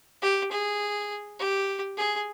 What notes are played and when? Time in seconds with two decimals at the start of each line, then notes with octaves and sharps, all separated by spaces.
0.22 G4
0.52 G#4
1.39 G4
1.97 G#4